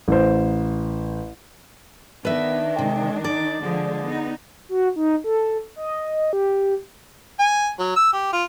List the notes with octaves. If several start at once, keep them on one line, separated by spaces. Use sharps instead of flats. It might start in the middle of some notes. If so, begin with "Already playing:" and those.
A1 C5
D#3 B3 D4 B4 E5
C3 G#3
D#4 D5
D3 F3 G#3 G#4
B3 D#4
F#4
D#4
A4
D#5
G4
G#5
F#3
E6
G4
F4